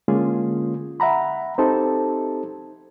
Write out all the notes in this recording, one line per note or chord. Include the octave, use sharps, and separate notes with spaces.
D3 G#3 A#3 C#4 F4 G#4
E5 F#5 A#5 B5
C4 D#4 G4 A4 C5 A5